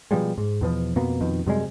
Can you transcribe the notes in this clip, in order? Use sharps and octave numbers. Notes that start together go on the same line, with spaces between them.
B2 F3 G3 G#3
G#2
E2 B2 F3
F2 B2 A#3 B3
F2 B2 D#3
F#2 C3 G3 G#3